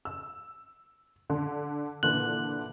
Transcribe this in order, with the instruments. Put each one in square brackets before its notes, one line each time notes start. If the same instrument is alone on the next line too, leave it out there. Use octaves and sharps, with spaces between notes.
[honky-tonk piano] E6
D3
[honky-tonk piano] A#2 D3 E3 [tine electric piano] F#6